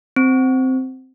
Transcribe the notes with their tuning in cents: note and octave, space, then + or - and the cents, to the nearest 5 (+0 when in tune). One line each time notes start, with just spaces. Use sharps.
C4 -5